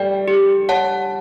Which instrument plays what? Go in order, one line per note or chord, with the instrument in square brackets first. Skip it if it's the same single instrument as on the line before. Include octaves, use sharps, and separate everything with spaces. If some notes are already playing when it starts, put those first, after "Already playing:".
Already playing: [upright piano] G3 A3 [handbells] D5 G5
[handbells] G4
C#5 F#5 A5